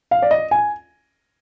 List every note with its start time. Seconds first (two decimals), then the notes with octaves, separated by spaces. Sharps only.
0.11 F5
0.22 D5
0.31 D#5
0.51 G#5